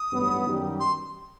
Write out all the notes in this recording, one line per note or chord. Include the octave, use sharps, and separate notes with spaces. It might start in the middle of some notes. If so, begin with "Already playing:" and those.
Already playing: D#6
A1 G2 F#3 B3
F#2 D#3 G3 D#4 G4
C6